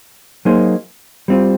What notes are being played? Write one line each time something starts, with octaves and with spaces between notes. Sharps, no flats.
F#3 A#3 D#4 G#4 C5
G3 C4 F4